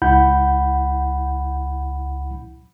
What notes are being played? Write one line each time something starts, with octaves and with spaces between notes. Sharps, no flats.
C#2 E4 F#5 B5 G6